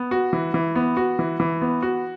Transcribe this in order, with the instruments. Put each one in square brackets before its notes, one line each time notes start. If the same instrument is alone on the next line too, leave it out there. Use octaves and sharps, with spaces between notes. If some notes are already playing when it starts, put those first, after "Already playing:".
Already playing: [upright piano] B3
F#4
E3
E3
B3
F#4
E3
E3
B3
F#4